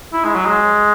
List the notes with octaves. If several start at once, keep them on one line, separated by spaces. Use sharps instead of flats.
E4
G#3
F#3
G#3